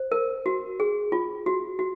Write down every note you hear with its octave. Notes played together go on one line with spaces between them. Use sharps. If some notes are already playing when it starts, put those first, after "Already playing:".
Already playing: C5
A#4
F#4
G#4
F4
F#4
F#4